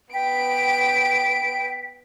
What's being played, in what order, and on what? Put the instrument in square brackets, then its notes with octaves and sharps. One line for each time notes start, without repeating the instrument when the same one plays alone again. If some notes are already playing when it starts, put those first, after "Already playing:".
[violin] B3 D7 [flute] G5 [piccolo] B6